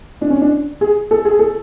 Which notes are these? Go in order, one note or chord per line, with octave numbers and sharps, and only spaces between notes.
D4
C#4
D4
G#4
A4
G#4
A4